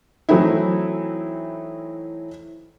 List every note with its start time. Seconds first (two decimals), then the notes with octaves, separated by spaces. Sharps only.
0.29 E3 F#3 A3 C4 D#4 E4